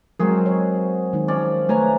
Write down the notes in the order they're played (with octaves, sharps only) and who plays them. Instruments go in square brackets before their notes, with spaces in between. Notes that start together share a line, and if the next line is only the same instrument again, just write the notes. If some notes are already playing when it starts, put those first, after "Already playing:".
[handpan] F#3 G#3 A#4 [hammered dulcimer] C4 F#4 G#4
[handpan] C#5
D#3 G#3 D#4
[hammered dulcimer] F3 C#4 D5
[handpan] A3 B4 C#5 [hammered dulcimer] G#5 A#5